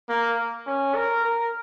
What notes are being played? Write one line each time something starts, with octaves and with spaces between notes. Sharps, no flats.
A#3
C#4
A#4
A#4